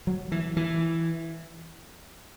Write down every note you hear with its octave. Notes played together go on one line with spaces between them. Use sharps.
F#3
E3
E3